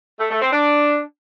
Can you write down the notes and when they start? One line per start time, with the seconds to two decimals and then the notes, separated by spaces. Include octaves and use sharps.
0.20 A3
0.31 A3
0.42 C4
0.53 D4